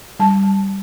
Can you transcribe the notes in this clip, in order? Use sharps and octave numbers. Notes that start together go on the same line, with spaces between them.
G3 A5